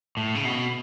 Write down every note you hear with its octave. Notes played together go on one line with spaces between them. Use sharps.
A2
C#3
B2